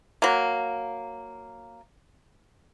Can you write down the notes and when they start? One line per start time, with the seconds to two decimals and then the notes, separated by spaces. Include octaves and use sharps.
0.22 F#3 A#3